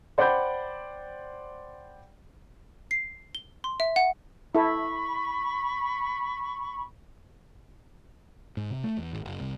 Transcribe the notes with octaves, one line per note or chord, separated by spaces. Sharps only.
C5 D5 F#5 G5 B5 G6
C7
G7
C6
E5
F#5
E4 A4 B5 C#6
G#2
C3
A3
E2
G#1
F#1
C2